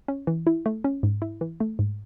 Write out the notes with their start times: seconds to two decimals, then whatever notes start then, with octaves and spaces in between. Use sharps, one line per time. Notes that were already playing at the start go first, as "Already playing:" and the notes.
0.08 C#4
0.27 E3
0.47 E4
0.66 A3
0.84 C#4
1.03 G#2
1.22 E4
1.41 E3
1.60 A3
1.79 G#2